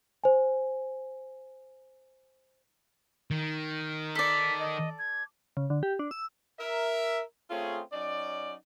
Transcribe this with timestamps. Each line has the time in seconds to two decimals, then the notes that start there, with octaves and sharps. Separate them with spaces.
0.24 C5 G#5
3.31 D#3
4.15 A4 D5 B6
4.60 D#5
4.99 G#6
5.57 C#3
5.70 D3
5.83 G4
5.99 D4
6.11 E6
6.59 A#4 E5
7.50 A3 C4 C#4 F4 G#4
7.92 F#3 C#4 D#4 D5